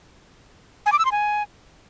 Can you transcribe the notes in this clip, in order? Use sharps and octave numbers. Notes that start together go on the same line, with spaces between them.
G#5
D6
E6
C6
G#5